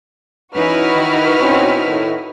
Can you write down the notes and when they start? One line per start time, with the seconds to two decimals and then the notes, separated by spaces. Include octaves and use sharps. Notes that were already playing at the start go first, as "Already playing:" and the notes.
0.55 E3 C#4 D#4 E4 F#4 B4 F6
0.92 D#3
1.40 B2 C4 C#4
1.86 A2 D#3